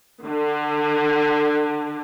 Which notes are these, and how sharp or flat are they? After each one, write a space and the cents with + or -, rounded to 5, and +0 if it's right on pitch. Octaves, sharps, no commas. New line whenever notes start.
D3 +25